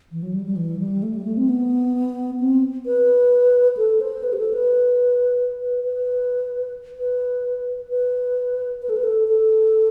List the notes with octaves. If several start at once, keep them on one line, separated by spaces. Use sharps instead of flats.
E3
F#3
G3
G3
E3
G3
A3
G3
A3
C4
B3
C4
B4
A4
C5
B4
G4
A4
B4
B4
B4
B4
B4
B4
A4
B4
A4
A4